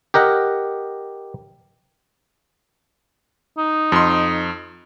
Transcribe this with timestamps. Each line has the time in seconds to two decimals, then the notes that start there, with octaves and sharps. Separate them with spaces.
0.14 G4 A#4 D#5 F#5
3.57 D#4
3.92 F2 C6